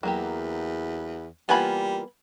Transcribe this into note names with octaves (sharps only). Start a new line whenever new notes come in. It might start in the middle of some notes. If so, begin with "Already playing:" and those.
E2 F#3 A#3 G4
E3 G3 A#3 B3 F4 G#5 B5